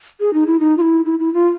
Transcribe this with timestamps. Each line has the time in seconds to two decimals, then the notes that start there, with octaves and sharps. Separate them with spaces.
0.20 G#4
0.34 D#4
0.47 E4
0.60 D#4
0.78 F4
0.82 E4
1.05 E4
1.19 E4
1.34 F4